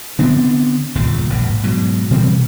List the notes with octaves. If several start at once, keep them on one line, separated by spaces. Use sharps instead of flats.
D3 B3 C4 D4
G1 D#2 A#2 C#3
D#1 A#1 G#2 C3
G#2 B2 F#3
B2 E3 G3 C4